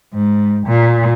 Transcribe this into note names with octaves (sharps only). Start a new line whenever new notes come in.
G#2
A#2